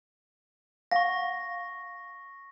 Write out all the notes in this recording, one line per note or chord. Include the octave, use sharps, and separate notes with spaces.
F5 F#5 C#6 A#6